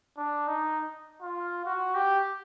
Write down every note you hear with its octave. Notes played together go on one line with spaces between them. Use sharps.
D4
D#4
F4
F#4
G4